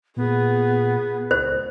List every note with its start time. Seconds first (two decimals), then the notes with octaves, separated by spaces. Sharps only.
0.17 A#2 B3 G#4
1.31 C#2 C5